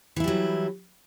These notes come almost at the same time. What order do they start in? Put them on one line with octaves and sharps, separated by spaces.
E3 E4 G3 F#3